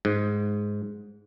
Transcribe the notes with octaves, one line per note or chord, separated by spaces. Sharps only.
G#2